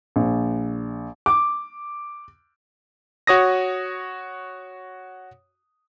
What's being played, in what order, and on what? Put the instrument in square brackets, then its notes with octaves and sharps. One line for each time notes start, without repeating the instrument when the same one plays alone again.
[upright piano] A#1
[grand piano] D6
[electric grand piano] F#4 C#5 D#6 A#6